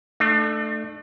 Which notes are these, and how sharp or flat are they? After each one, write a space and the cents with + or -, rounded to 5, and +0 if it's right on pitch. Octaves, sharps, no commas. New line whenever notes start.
A3 +0 D4 +35